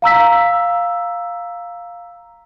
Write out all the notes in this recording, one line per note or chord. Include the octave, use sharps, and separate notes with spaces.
F5 A#5 E6 B6